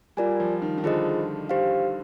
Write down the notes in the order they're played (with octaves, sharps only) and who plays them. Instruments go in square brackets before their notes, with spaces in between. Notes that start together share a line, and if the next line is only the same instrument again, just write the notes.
[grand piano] G3 [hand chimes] F4 A#4 D5 G#5
[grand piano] F3
D#3
D#3
[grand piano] D3 [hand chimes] F4 G#4 C5 D#5
[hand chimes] G4 C5 F5